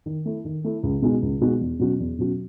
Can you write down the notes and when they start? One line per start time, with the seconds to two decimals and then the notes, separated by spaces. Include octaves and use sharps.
0.06 D#3
0.25 A3 E4
0.45 D#3
0.64 A3 E4
0.83 C#2
1.02 B2 G#3 D#4 F#4
1.22 C#2
1.41 B2 G#3 D#4 F#4
1.61 E2
1.79 B2 F#3 C#4 F#4
1.99 E2
2.18 B2 F#3 C#4 F#4